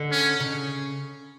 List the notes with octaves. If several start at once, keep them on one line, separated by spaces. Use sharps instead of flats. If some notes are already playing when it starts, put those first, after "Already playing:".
Already playing: D3
C#4
C#3